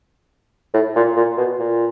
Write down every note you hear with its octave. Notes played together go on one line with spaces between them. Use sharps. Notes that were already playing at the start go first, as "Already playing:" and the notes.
A2
A#2
A#2
B2
A#2